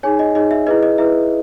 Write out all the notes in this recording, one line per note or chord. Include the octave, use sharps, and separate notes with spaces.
D#4 G#4 C#5 G#5
D#5
D#4 G#4 C#5 D#5
E5
E4 G#4 B4 D#5
D#5
E4 G#4 B4 E5